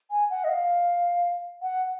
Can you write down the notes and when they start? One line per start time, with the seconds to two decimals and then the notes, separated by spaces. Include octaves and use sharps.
0.11 G#5
0.30 F#5
0.44 D#5
0.49 F5
1.62 F#5